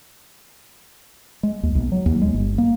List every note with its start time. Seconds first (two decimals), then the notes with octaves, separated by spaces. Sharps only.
1.43 G#3
1.63 D#2
1.75 B1
1.92 F#3
2.06 D#2
2.22 G#3
2.34 G1
2.58 A#3